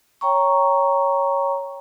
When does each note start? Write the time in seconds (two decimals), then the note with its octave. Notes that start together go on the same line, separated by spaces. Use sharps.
0.21 C#5 G5 A#5 C#6